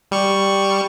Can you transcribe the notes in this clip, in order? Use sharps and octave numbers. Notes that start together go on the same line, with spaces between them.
G3 C#6